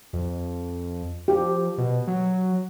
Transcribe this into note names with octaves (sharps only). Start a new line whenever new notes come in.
F2
F3 G4
B2
F#3